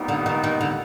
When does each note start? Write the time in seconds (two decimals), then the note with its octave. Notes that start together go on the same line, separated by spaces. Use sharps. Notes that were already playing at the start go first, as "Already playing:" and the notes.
Already playing: A#2 G3 B3 D#4
0.08 D3
0.26 D#3
0.44 D#3
0.61 D3